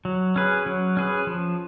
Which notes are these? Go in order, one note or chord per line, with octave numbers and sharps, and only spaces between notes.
F#3
C#4 G#4 B4
F#3
C#4 G#4 B4
F3